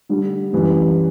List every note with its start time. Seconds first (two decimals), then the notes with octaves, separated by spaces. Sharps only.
0.09 D3 G3 D4
0.53 F#2 E3 G3